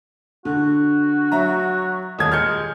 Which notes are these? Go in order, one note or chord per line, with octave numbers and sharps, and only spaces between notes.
D3 F#4
F#3 E5 A#5
D#1 D#5 G#6
G#3 F6 G6 C#7